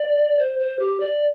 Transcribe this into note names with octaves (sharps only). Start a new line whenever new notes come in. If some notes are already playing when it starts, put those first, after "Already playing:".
Already playing: D5
C5
C5
G4
D5